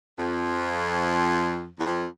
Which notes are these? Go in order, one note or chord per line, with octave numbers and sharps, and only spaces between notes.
F2
E2
F2